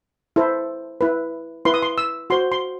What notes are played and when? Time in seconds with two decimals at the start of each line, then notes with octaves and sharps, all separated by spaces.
0.36 E4 A4 C5
1.01 E4 B4
1.65 E4 B4 C6
1.74 D#6
1.82 C6
1.98 E6
2.30 F#4 C5 C6
2.52 C6